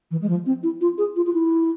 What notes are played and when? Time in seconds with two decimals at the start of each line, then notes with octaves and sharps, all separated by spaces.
0.11 E3
0.22 G#3
0.29 F3
0.46 C4
0.63 E4
0.81 F4
0.98 G#4
1.16 F4
1.27 F4
1.33 E4